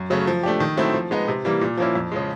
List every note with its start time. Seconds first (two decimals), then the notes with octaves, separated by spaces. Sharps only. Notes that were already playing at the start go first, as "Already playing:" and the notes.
Already playing: F#2
0.10 C#3 F#3 A3 C#4
0.27 F3
0.43 A3 D4 G4
0.60 D#3
0.77 F#3 A3 C4 E4
0.94 F3
1.11 G#3 B3 D#4
1.28 C3
1.45 E3 G3 A#3
1.61 A#2
1.77 F3 A#3 C#4 E4
1.95 F2
2.12 C#3 F3 G#3